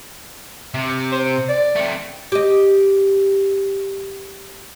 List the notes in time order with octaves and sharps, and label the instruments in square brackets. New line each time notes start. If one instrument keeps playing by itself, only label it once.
[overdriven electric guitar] C3
[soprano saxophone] C5
D5
[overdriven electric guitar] A3 C4
[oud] G4 D#5